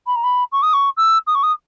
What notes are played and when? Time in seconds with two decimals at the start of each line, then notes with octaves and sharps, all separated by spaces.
0.07 B5
0.16 A#5
0.24 B5
0.52 C#6
0.62 D#6
0.73 C#6
0.97 E6
1.27 D#6
1.35 C#6
1.43 D#6